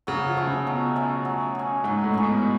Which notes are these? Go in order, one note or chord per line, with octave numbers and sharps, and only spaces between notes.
C#3 F#3
F3
A3 C#4 G#4
C#3
B2 F#3
A3 C#4 G#4
F#3
C#4 G#4
G#2 F#3
A2
C#4 G#4
B2